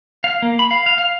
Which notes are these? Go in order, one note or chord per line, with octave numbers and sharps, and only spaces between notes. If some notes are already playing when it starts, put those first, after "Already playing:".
F5
A#3
B5
F5
F5
F5